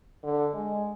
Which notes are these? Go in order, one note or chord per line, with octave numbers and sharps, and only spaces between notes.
D3
G#3